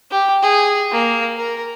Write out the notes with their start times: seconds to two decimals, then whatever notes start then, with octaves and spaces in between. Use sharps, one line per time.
0.11 G4
0.43 G#4
0.92 A#3
1.37 A#4